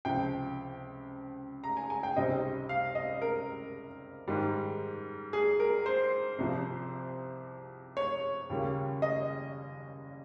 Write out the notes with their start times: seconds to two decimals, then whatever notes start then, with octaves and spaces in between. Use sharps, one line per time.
0.05 C#2 C3 F3 G5
1.64 A#5
1.77 G#5
1.90 G#5
2.03 G5
2.16 C#2 C3 G3 C4 D#4 D#5
2.69 F5
2.95 D#5
3.22 A#4
4.28 G#2 D#3 G3
5.33 G#4
5.60 A#4
5.86 C5
6.38 C2 C3 F3
7.97 C#5
8.50 D#2 C#3 G3 A#3 F4
9.02 D#5